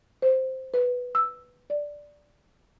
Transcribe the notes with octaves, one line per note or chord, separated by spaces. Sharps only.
C5
B4
E6
D5